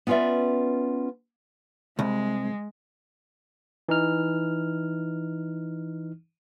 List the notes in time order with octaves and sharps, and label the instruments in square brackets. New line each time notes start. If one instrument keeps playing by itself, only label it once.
[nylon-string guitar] B3 C#4 F4 B4 D5 E5
[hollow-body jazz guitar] C2 [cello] G#3
[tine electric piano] E3 D#4 F6